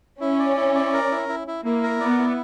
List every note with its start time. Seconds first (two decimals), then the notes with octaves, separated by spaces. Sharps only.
0.21 C#4 E4
0.39 D5
0.57 E4
0.75 D5
0.93 A#4
1.12 E4
1.29 E4
1.48 E4
1.65 A#3 E4
1.83 A#4
2.00 B3 D5
2.19 E4